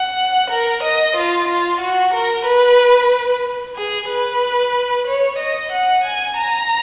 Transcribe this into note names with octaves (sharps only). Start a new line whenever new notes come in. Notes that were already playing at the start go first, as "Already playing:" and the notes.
Already playing: F#5
A#4
D#5
F4
F4
F#4
A#4
B4
G#4
B4
C#5
D#5
F#5
G#5
A#5